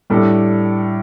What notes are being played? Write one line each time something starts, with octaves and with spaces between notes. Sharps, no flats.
A2 G3 D4 A4